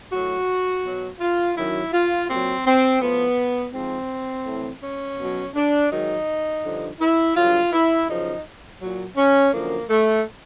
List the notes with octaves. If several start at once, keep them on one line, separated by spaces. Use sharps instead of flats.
A2 F#3 F#4
B2 F#3
F4
F#2 D#3 F#3 E4
F4
A#2 F#3 C4
C4
A2 F3 B3
G#2 F3 C4
A2 E3
C#4
B2 F#3
D4
G#2 D#3 F#3 D#4
G2 D3 F3
E4
G2 D3 F#3 F4
E4
F#2 C#3 F3 D#4
A#2 F#3
C#4
F#2 D3 F3 A#3
A3